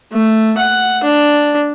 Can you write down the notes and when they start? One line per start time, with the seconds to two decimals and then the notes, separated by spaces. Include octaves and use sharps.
0.13 A3
0.58 F#5
1.03 D4